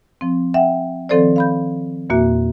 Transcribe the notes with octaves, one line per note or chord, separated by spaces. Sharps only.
F3 C4
E5 F#5 G5
D#3 F3 C4 A4 C5 D5
F5 B5 G6
E2 A#2 A#3 F#4 E5